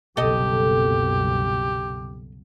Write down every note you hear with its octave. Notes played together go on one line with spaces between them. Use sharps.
F#1 C2 B2 G4 A4 D#5